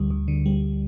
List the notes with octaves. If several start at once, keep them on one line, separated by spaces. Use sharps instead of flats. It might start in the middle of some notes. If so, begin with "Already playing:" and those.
Already playing: D2 D3 G3
D2
D3
G3